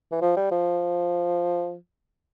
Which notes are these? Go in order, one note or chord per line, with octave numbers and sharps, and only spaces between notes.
E3
F3
G3
F3